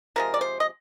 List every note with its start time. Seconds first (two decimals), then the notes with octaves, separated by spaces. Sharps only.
0.16 C3 F3 G#3 A#4
0.34 D5
0.41 C5
0.60 D#5